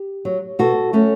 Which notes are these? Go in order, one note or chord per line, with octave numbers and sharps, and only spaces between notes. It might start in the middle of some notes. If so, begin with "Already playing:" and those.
Already playing: G4
F#3
B2 F#4 A4
F#3 A3 C#4